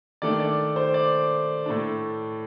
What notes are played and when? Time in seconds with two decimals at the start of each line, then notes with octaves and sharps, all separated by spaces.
0.22 D#3 A3 D4 D5
0.40 D5
0.76 C5
0.94 D5
1.66 A2 A3 D4